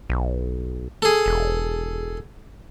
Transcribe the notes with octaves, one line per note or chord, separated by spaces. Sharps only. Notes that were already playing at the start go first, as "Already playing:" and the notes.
B1
G#4 A4
E1